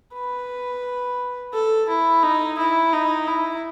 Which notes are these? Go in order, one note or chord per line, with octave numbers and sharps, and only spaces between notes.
B4
A4
E4
D#4
E4
D#4
E4